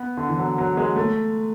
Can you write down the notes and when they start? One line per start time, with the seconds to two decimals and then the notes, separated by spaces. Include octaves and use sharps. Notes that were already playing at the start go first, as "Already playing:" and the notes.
Already playing: B3
0.17 D3
0.28 E3
0.38 F#3
0.58 F#3
0.77 G#3
0.96 A3